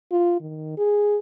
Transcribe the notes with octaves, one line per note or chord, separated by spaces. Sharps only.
F4
D#3
G#4